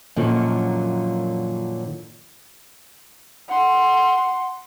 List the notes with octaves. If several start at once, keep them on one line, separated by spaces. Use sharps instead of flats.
F#2 A#2 D3 D#3 F3 F#3
F#5 C6